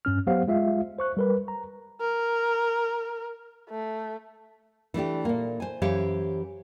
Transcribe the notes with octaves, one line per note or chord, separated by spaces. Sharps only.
G2 C#4 F6
F#3 B3 G4 C5 F5 F#5
G#3 F4 E5 F5
C5 C#6 F#6
G3 A#4 B4
A#5
A#4
A3
E3 A3 D4 G4
A#2 A#3
C5 G#5
F#2 E3 G4 C5 C#5 F5